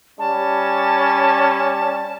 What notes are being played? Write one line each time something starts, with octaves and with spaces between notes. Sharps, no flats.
G3 C#4 A5